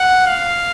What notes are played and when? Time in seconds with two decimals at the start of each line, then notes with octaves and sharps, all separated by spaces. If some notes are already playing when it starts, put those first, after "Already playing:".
Already playing: F#5
0.26 F5